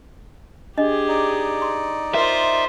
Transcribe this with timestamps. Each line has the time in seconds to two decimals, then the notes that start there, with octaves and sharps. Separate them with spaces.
0.78 D4 G4 G#4 D#5
1.08 D#4 D5
1.62 C6
2.14 F4 A#4 C5 E5